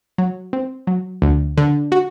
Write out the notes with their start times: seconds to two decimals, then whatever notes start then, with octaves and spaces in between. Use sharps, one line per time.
0.18 F#3
0.53 C4
0.87 F#3
1.22 D2
1.57 D3
1.92 F#4